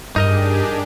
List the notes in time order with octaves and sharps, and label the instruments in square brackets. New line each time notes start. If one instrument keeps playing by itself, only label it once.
[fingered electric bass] G2 [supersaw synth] D4 G4 G#4 [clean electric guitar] D#4 A#4 D#5